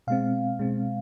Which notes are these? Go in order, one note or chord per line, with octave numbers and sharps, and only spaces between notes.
B2 G#3 C4 F5
B2 G#3 C4